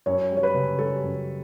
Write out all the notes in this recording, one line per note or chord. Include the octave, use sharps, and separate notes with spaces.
F#2 C#5
G3
C#5
B4
C#3
G3 A4
F#2